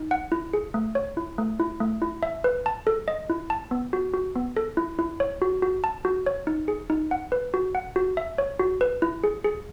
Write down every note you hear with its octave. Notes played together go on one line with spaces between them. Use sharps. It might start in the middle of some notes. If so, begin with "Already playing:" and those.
Already playing: D#4
F#5
E4
G#4
A3
C#5
E4
A3
E4
A3
E4
E5
B4
A5
A4
D#5
E4
A5
B3
F#4
F#4
B3
A4
E4
E4
C#5
F#4
F#4
A5
F#4
C#5
D#4
G#4
D#4
F#5
B4
F#4
F#5
F#4
E5
C#5
F#4
B4
E4
G#4
G#4